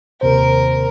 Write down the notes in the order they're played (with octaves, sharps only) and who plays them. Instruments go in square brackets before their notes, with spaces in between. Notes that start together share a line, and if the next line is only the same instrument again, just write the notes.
[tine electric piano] D#2 C3 C5 [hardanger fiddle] A#4